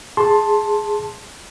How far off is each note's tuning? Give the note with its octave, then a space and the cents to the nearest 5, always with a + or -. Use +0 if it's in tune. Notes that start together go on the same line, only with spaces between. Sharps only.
G#4 +0 A5 +0 C6 +15